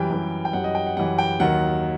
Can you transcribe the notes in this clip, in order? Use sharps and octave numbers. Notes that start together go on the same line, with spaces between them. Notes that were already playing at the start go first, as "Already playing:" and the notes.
Already playing: F#2 E3 G3 G5
F#2 E3 G3
G5
F#2 E3 G3 F#5
D#5
G5
F#5
F#2 E3 G3 F#5
G5
D#2 D#3 F#3 F#5